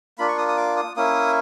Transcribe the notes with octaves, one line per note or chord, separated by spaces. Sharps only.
A#3 D4 F4 B5
C#6
D#6
D#6
D6
D#6
A#3 C#4 E4 D#6